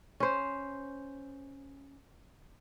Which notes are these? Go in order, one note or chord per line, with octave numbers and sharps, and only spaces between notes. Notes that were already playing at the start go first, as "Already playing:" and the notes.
C#4 C5